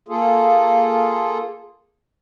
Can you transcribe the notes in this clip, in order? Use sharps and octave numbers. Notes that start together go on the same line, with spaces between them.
A#3 F4 G#4 A4